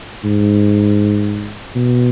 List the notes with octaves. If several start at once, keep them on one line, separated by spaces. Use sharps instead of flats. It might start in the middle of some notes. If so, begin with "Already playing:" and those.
G#2
B2